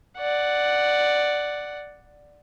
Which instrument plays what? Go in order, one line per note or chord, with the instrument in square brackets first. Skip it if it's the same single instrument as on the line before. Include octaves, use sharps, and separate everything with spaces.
[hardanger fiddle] D5 F#5